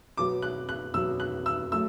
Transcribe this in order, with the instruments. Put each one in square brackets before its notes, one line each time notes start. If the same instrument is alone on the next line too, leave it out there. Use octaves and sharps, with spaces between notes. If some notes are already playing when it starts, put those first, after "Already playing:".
[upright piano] B2 F#3 B3 D6
F#6
F#6
B2 F#3 B3 E6
F#6
E6
F#3 A3 E6